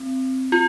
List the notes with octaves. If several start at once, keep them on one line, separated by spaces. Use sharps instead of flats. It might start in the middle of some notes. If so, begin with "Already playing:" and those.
Already playing: C4
F4